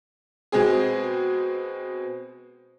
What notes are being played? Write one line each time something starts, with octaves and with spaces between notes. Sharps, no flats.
B2 G#3 C4 G#4